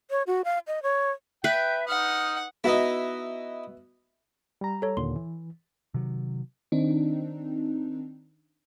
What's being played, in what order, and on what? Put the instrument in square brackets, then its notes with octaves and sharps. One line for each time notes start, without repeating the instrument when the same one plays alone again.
[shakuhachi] C#5
F#4
F5
D#5
C#5
[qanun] B4 [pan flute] E5 [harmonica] G5
[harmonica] D#4 D#6 [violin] F#5 [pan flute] F6
[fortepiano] B3 F#4 E5 [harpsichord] D#4 E4
[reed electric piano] G3 A#5
[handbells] A4 C#5
[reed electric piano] D#2 A#2 D3 [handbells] C6
[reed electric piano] E3
[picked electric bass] C3 D#3 F#3
[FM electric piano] D#3 C4 D4 D#4